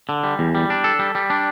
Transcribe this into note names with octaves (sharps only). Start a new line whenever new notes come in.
D3
G3
E2
G3
D4
A4
G3
G3
D4